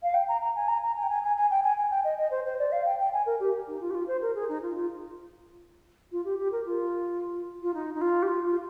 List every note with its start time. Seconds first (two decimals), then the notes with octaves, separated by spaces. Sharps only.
0.03 F5
0.14 G5
0.28 A#5
0.41 A#5
0.55 G#5
0.68 A#5
0.82 A#5
0.96 G#5
1.03 G5
1.09 G#5
1.23 G#5
1.36 G#5
1.50 G5
1.63 G#5
1.77 G#5
1.90 G5
2.04 D#5
2.18 D#5
2.31 C5
2.45 C5
2.59 D5
2.72 F5
2.86 G5
2.99 G5
3.13 G#5
3.26 A#4
3.40 G4
3.67 D#4
3.80 F4
3.90 G4
3.94 F4
4.07 C5
4.22 A#4
4.35 G#4
4.48 D#4
4.62 F4
4.75 F4
6.11 F4
6.25 G4
6.38 G4
6.52 A#4
6.65 F4
7.62 F4
7.74 D#4
7.94 D#4
8.01 F4
8.22 G4
8.28 F4
8.45 F4